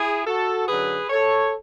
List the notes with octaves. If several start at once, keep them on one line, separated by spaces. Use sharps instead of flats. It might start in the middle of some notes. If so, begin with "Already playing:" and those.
Already playing: E4 G#4
F#4 A4
F#2 D3 F#3 G#4 B4
A4 C#5